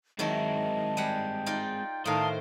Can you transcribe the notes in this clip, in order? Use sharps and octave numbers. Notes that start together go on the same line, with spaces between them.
D#3 F#3 G#3 C4 E4 D#5 A5
G3 G#4 F#5 G5
D#4 F4 D5
A2 D#3 C5 F5 A5 A#5 D#6